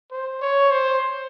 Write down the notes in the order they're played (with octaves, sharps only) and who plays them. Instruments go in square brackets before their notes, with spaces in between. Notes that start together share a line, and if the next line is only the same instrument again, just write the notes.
[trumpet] C5
C#5
C5